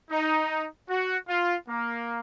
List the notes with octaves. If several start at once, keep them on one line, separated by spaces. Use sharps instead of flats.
D#4
F#4
F4
A#3